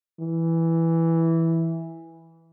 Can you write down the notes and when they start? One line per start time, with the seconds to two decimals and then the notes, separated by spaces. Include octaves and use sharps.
0.20 E3